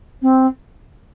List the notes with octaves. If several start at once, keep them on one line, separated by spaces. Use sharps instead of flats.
C4